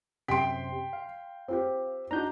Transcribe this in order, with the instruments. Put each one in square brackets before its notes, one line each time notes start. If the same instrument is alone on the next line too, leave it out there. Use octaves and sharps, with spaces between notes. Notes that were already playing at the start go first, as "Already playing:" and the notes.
[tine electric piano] F#2 C3 [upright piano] G5 C6 [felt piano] B6 D7
[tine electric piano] F5
[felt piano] C4 F4 G4
[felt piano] D4 D#4 F#4 [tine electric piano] A#5 G6